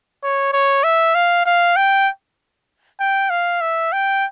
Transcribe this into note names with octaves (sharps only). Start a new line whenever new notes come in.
C#5
C#5
E5
F5
F5
G5
G5
F5
E5
G5